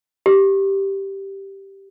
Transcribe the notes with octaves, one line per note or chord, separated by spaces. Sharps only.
G4